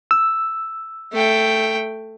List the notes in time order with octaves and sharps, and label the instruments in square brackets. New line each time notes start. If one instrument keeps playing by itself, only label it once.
[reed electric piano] E6
[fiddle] A3 G5